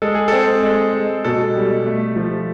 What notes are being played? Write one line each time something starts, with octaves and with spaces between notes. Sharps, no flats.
G#3 A4
G#4
C4 A4
G#3
G#3
B2 A4
G3
A3
F3